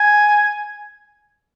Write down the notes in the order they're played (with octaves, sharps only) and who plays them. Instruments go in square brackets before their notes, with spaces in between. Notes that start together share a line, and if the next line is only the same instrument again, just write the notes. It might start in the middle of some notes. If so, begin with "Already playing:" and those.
Already playing: [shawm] G#5